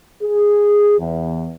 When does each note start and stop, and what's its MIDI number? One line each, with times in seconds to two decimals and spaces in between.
0.22 0.98 68
0.99 1.52 40